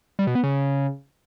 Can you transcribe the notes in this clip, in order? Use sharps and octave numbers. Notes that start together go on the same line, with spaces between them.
G3
B2
B3
C#3